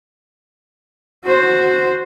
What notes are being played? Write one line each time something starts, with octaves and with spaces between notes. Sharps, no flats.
F#4 C5